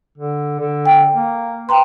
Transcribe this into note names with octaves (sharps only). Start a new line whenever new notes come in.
D3
D3
G5
A#3
B4 G5 A#5 C6